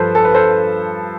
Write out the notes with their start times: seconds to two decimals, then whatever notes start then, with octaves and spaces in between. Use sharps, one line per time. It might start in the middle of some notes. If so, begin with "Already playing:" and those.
Already playing: G2 F3 A4 B4 C5
0.15 A4
0.25 B4
0.34 A4 C5